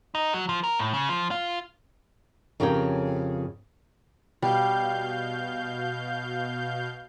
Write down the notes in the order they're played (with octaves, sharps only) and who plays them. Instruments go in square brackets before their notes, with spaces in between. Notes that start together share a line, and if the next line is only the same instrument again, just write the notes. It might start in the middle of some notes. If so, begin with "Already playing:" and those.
[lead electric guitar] D#4
F#3
F3
A#4
A2
C#3
F3
F4
[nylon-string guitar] F2 C#3 C#4 G4 A#4 G5
[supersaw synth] B2 F5 G6 [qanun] G3